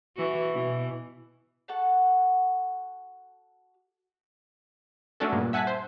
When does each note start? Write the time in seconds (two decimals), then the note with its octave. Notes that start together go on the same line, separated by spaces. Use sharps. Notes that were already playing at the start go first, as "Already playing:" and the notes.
0.16 E3 F#4
0.53 B2 E3
1.68 F#4 A4 F#5 A5
5.20 A3 C#4 D4 F#4 A4
5.32 G2 A#2
5.53 E5 F#5 G#5 A5 F#6 B6
5.67 C5